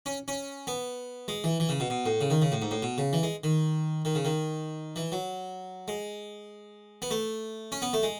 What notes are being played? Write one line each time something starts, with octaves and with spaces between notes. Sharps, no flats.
C#4
C#4
B3
G#3
E3
E3
C#3
B2
B2
A2
C#3
D#3
C#3
A2
G#2
A2
B2
C#3
E3
G#3
D#3
D#3
C#3
D#3
E3
F#3
G#3
B3
A3
C#4
B3
A3
G#3